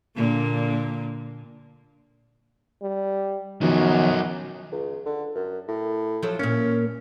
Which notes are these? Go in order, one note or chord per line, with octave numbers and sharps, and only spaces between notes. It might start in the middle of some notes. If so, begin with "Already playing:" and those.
A#2 D3 A#3
G3
F#2 D#3 F3 F#3 B3 D#4
C#2
D3
F#2
A2
F3 F#3 A4
A#2 A#3 C#4